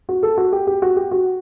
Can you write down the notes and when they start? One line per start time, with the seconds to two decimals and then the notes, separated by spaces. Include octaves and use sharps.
0.09 F#4
0.23 A4
0.37 F#4
0.53 G4
0.67 G4
0.82 F#4
0.96 G4
1.11 F#4